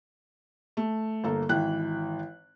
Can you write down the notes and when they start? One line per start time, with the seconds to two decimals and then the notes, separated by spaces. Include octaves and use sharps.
0.77 A3
1.24 G1 A#3 A4
1.49 G#1 E3 G5 F#6